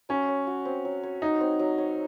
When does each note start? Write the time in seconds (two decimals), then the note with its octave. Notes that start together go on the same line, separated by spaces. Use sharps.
0.09 F#3 C#4
0.29 C#5
0.47 F#4
0.65 C4
0.85 F#3
1.03 C#5
1.22 D#4 F#4
1.41 C4
1.59 F#3
1.78 C#5